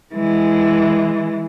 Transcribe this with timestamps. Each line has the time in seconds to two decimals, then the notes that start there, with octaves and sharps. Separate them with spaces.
0.14 E3 G#3